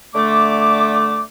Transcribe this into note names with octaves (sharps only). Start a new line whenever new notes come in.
D3 A3 D6